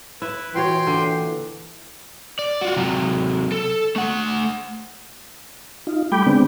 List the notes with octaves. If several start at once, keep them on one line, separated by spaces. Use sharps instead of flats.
E4 B4
A#2 E3 F#4 C#5 G5 C6
D3
D5
F4 F#4
C3 F#3
A4
A3 F#5
D#4 F4
G3 A3 G5 B5 D6 G6
D3 G#3 B3 C4 D4